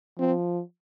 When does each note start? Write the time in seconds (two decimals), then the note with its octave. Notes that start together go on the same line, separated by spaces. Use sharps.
0.19 F3 C4